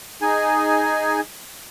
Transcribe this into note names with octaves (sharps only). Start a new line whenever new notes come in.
D#4 G#4 G#5